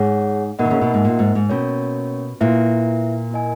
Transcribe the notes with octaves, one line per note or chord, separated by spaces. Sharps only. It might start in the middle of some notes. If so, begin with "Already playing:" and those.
Already playing: G#2 G#4 C#5 F#5
B2 A#3 D#4 A#4 D#5 F#5
D#3
C#3
B2
G#2
A#2
G#2
G#2
B2 A#3 C#4 F#4 A#4 C#5
A#2 E4 B4 E5
A#3 E4 A#4 D#5 G#5